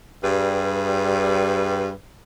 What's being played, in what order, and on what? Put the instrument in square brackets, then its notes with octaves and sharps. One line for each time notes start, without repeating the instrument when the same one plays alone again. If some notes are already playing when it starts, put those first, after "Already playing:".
[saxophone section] G2 G3 G#4 B4